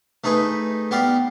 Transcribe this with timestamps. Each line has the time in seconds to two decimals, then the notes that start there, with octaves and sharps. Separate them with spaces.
0.24 A3 D#4 G#4 B4
0.91 B3 G4 D5 F5